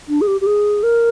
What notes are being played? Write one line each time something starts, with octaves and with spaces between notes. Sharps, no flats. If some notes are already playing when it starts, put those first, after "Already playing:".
D4
G#4
G4
G4
G#4
A#4